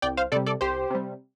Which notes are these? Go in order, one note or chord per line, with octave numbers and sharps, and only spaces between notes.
C2 D5 G5
C5 F5
C3 G3 A4 D5
A4 D5
C2 G4 C5
C3 G3